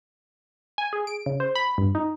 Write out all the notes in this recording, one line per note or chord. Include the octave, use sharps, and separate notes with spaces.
G#5
G#4
D7
C#3
C5
B5
G2
D#4